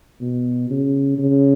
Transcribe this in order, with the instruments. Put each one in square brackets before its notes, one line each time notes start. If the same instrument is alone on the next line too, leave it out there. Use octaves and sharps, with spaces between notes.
[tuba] B2
C#3
C#3